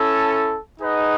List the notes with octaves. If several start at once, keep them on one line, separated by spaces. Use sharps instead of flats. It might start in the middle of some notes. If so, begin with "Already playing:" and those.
Already playing: C#4 E4 A4
D#4 G#4 B4 D#5 F#5